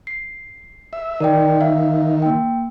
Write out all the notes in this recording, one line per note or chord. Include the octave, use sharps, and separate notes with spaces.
C7
E5
D#3 A#4 D5 G5
E5 F5
A#3 G5